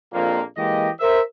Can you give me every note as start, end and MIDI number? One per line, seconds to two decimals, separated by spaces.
0.13 0.41 34
0.13 0.41 41
0.13 0.41 46
0.13 0.41 58
0.57 0.89 52
0.57 0.89 56
0.57 0.89 58
0.57 0.89 67
0.57 0.89 75
1.00 1.20 70
1.00 1.20 72
1.00 1.20 76